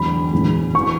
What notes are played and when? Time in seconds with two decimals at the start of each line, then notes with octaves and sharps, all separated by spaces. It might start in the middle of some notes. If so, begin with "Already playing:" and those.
Already playing: E2 D3 F#3 B5
0.33 E2 D3 F#3
0.74 E3 C#6